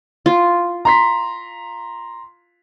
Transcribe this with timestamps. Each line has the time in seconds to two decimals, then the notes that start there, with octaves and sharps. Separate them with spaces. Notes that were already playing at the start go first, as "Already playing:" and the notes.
0.26 F4
0.85 A#5 C6 B6